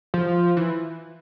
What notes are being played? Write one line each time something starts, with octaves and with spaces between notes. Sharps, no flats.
F3
E3